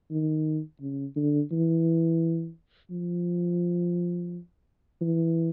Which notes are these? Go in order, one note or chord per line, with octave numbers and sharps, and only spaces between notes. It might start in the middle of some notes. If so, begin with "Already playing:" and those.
D#3
C#3
D3
E3
F3
E3